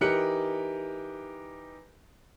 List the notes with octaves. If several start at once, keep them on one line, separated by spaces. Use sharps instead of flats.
E3 D#4 G4 A#4 F#6 C#7